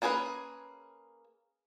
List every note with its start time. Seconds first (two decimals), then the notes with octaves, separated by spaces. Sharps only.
0.02 A#3 C#4 G#4 A4 B4